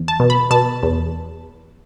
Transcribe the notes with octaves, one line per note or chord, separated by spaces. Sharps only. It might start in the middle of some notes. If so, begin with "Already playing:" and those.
Already playing: E2
A5
B2
B5
B2 A5
E2